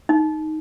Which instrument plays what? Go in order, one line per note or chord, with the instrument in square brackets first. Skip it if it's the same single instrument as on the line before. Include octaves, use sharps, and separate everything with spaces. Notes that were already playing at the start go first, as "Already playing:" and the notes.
[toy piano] D#4